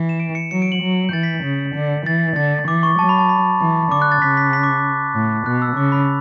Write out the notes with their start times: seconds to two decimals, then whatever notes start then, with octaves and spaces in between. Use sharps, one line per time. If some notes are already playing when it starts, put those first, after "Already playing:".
Already playing: E3
0.09 E7
0.20 D7
0.35 C#7
0.51 F#3 C#7
0.62 D7
0.72 F#7
0.82 F#3
1.09 G6
1.13 E3 A6
1.23 B6
1.44 C#3
1.75 D3
2.06 E3 A6
2.36 D3 A6
2.67 E3 D6
2.83 C#6
2.99 F#3 A5
3.09 B5
3.19 A5
3.29 B5
3.61 E3
3.92 D3 D6
4.02 F#6
4.12 A6
4.22 C#3 B6
4.37 B6
4.53 B6
4.63 D6
5.15 A2
5.46 B2 F#6
5.62 E6
5.77 C#3 D6
5.92 B5